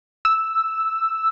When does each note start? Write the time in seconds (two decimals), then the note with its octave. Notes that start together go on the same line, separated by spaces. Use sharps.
0.25 E6